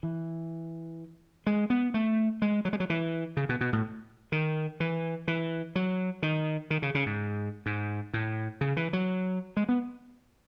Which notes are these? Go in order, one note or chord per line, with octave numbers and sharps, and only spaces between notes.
E3
G#3
B3
A3
G#3
F#3
G#3
F#3
E3
C#3
B2
B2
A2
D#3
E3
E3
F#3
D#3
D#3
C#3
C#3
G#2
G#2
A2
C#3
E3
F#3
G#3
B3